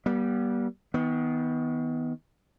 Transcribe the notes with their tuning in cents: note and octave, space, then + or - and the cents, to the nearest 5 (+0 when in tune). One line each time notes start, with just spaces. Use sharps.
G3 -15 B3 -45
D#3 +35 B3 +0